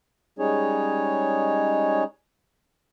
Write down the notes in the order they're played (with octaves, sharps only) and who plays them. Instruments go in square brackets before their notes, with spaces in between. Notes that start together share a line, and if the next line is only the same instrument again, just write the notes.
[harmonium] G3 G#3 C#4 D#4 G#4 C#5